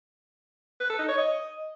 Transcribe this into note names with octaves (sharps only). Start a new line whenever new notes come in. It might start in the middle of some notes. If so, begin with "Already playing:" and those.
B4
A4
D#4
C#5
D#5